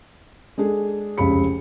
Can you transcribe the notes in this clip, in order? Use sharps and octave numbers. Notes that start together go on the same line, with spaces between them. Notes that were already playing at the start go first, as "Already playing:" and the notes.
G#3 D4 G#4 A4
F1 C#2 C#3 B5 C#7